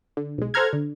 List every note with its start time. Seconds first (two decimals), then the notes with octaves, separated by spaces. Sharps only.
0.17 D3
0.38 B1 G#3
0.54 A4 C5 F#5 A#5 F6 G#6
0.73 D3